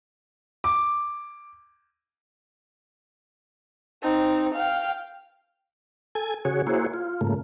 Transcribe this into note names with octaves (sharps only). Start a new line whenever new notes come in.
D6
C4 D#4
F5 G5
A4 G#5
C#3 F#4 G#4 C#5
A#3 E4 F#4 G#4 C5 C#5
F4
G#2 C#3 A3 A#3